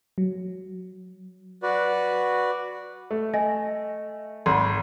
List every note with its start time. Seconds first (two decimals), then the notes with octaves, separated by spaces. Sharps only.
0.18 F#3
1.63 F#4 B4 D5
3.11 A3
3.34 D#5 G#5 A#6
4.46 G#1 B5 C6